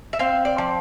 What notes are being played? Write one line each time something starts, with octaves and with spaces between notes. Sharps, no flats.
E5
C4 F5
D5
F3